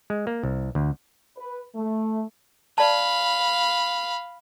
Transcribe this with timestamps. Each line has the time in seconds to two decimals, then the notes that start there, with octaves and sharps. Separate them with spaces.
0.10 G#3
0.27 A#3
0.43 C2
0.75 D2
1.37 B4
1.75 A3
2.78 D5 F5 A5 B5